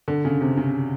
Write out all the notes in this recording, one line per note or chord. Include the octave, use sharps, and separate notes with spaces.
D3
C#3
C3
C#3